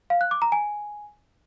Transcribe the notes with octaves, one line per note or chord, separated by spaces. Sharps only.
F5
F#6
D6
A#5
G#5